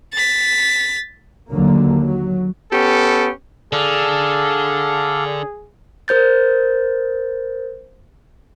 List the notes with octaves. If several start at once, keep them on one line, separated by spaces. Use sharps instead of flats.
A6 B6
D#2 D3 F#3 A#3
F#3
B3 C#4 G4 A4
D3 G#4 A4 D5 F5
A#4 C5 G6 A6